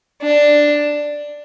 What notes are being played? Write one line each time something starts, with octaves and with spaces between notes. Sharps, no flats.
D4